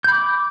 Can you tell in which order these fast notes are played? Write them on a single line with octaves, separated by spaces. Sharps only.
G6 B5 D6